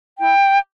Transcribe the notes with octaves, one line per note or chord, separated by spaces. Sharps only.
E4 G5